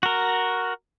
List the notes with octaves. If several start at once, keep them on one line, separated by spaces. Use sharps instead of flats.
F#4 A#4